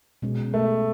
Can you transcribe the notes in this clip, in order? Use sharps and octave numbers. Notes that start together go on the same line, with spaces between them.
B2 G#3 C#4 G#4
A3